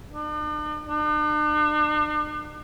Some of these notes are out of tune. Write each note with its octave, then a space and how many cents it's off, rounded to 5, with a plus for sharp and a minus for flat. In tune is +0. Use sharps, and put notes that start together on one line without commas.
D4 +45
D4 +45